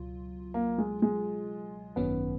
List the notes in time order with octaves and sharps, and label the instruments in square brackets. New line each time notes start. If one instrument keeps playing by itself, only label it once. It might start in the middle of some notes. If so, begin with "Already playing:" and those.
Already playing: [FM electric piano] C#2 B2 F#3 F4
[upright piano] A#3
G#3
G#3
[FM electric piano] G#1 F#2 D#3 F#3 C#4 [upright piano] B3